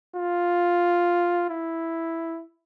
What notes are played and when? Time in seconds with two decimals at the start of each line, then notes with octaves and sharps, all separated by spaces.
0.16 F4
1.49 E4